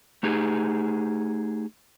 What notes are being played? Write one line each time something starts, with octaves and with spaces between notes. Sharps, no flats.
A3 D#4 G4 G#4